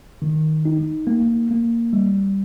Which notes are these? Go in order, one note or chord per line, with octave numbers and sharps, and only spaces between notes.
D#3
D#4
A#3
A#3
G3